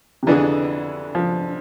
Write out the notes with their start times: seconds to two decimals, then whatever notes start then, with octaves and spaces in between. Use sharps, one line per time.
0.23 C3
0.27 F2 D3 E3 B3 D4 G#4
1.15 F3